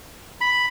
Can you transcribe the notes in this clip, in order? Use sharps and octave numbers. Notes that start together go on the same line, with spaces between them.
B5